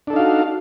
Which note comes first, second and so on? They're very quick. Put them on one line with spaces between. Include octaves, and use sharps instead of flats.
D4 A4 D#4 F5 F#4